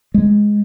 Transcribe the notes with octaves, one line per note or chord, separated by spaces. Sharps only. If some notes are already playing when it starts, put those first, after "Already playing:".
G#3